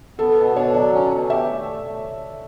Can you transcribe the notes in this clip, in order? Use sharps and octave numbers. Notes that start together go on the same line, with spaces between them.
B3 A4
B2
D4 C#5
F#3 D5
C#4
B2
G4 E5
A3